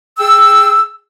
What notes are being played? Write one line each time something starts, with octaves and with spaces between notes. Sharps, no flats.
G#4 G5 E6